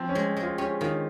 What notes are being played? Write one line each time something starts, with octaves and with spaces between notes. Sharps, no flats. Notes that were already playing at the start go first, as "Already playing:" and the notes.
Already playing: F3 C4
C#4
G#3
G#3
F4
C#4 G4
D#3 F4